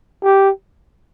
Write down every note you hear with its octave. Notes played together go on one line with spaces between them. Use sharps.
G4